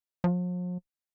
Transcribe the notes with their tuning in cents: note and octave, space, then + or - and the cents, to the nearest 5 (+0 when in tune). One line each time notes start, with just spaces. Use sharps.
F3 +45